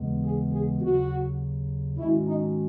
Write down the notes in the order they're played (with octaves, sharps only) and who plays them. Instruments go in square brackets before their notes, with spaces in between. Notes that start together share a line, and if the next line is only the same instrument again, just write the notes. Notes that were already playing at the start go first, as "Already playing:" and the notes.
Already playing: [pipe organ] D#2 C#3 E3 G#3 B3
[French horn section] G#4
G#4
[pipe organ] D#2 C#3 F#3 [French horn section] F#4
[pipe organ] G#2 D#3 G#3 C#4 F#4 [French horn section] E4
[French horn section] D#4